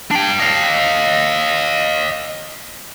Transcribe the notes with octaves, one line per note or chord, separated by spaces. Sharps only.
D4 G5
D#5 F5